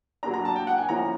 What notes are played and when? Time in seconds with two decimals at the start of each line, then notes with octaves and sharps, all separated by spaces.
0.23 D4 A#5
0.25 F#3 A#3
0.34 A#5
0.45 A5
0.56 G5
0.67 F#5
0.78 G#5
0.89 F3 A#3 C#4 E4 A#5